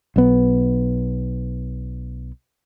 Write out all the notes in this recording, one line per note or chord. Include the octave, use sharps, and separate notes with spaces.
B1 B3